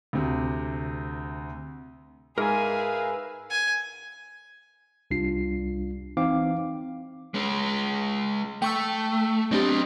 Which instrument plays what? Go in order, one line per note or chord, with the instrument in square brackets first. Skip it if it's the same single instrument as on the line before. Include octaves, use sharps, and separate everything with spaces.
[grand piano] D2 C3
[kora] G#2 [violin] G#4 [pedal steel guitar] A#4 G#5 [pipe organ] B4 E5 F5
[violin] G#5
[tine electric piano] C2 G3 D4 F4 C7
E3 C4 D#4 F5 D6
[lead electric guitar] G#3 C#4
[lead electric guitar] A3 [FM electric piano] G5 C#6 E6
[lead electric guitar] F#3 D#5 [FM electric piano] C4 D4 G4